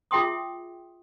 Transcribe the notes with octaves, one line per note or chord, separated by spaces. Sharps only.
F4 G#4 E5 G5 C6 D#6